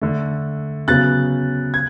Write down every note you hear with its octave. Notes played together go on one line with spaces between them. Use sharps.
D3 A3
C#3 F#3 B3 F#6 A6
G#6